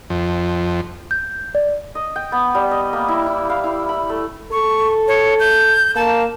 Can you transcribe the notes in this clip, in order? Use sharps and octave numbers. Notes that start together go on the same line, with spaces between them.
F2
G6
D5
D#5
G5
B3
G3
D#5
A#3
E4
E4
F5
E4
B5
A3
A4 C#6
C#5
G6
A#3 A5